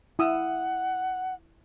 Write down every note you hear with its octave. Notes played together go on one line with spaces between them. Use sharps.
E4 F#5 D#6 E6